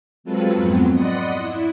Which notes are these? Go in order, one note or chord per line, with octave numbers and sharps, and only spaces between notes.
F#3 G#3 C4 F4 A4 B4
F2 G#2 F#3 B3 C4
D5 D#5 F#5 B5 C6 D#6
E4